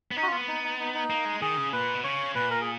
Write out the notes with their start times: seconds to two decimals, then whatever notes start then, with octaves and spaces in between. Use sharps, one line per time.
0.11 B3
0.17 C#4 D#4
0.23 F#4
0.27 F4
0.32 B3
0.48 D#4
0.63 D#4
0.79 D#4
0.94 D#4
1.10 A#3
1.25 G#3
1.41 D#3 G#4
1.57 C#3
1.73 A#2 B4
1.95 B2
2.04 C#3 C#5
2.35 A#2 B4
2.51 A#4
2.61 G#4